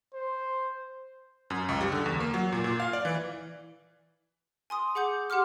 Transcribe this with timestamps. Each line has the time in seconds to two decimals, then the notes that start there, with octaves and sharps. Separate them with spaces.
0.14 C5
1.50 F#2
1.69 C#2
1.81 G3
1.92 D3
2.06 E2
2.20 A#3
2.34 F#3
2.52 A#2
2.64 A#2
2.80 F5
2.93 D5
3.05 E3
4.70 G#5 C6 D#6
4.95 G#4 F#5 D6 G6
5.30 G4 F#5 C6 D6 F6